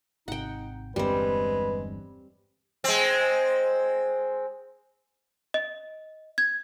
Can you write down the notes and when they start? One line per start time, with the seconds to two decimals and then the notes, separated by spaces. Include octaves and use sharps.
0.28 G#1 C3 D#4 F#5 G5
0.96 G1 E2 G2 G3 G#3 C4 B4
2.84 G#3 C4
5.54 D#5
6.38 G#6